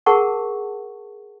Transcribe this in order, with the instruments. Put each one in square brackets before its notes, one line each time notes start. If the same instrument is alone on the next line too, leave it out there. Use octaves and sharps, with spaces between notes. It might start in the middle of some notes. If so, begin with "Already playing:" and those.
[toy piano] G#4 A#4 F#5 A5 C#6